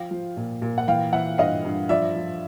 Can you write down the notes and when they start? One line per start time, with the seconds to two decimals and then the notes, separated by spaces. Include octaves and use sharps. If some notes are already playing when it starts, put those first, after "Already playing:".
Already playing: F3 F5 G5
0.11 F3
0.37 A#2
0.62 A#2
0.78 F#5
0.88 E3 F5 G5
1.13 E3 E5 F#5
1.38 G2 D#5 F5
1.65 G2
1.89 F3 D5 E5
2.16 F3